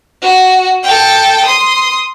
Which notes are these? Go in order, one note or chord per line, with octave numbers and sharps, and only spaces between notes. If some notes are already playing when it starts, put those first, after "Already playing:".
F#4
A4 G5
C6 D#6